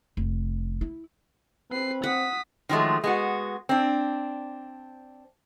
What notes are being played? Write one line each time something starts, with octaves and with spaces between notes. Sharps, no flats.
F1
E4
C4 B4 C7
F#5 D#6 B6
D#3 F3 F#3 G#3 A3
G#3 B3 F#4
C4 D4